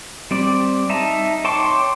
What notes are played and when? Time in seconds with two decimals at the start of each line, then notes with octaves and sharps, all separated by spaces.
0.31 G3 C4 D5
0.90 D#4 E5 A5 A#5
1.45 C#5 G5 A5 C6 D6